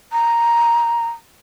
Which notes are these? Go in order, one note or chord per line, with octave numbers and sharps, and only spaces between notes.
A#5